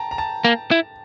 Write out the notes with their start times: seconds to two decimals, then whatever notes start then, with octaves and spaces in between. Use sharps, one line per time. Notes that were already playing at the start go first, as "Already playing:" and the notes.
Already playing: G5 A5 A#5
0.11 A#5
0.18 A5
0.45 A#3
0.71 E4